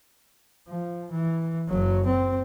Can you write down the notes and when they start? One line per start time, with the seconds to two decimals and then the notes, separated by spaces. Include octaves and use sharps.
0.69 F3
1.12 E3
1.69 F#1 F#3
2.06 C4